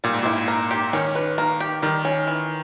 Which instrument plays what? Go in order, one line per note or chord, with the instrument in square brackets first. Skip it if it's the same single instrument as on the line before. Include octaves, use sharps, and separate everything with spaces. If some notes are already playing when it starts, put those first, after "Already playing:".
[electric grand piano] A#2 [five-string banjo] G3
[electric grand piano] G#2
[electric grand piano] A#2 [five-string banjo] E4
[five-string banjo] A#3
G4
[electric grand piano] D#3 [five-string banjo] C#4
[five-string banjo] B4
A#3
G4
[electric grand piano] D#3 [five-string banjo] G3
[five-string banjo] C#4
E3